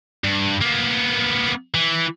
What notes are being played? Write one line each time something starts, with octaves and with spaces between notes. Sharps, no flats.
G2
A#3 B3
E3